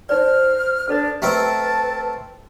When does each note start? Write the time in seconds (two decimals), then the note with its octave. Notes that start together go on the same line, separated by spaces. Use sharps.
0.09 D#4 B4 C5 D5 F6
0.89 D4 A4 B4 D5
1.22 A3 C4 G4 A#4 B4 D#5 A5 E6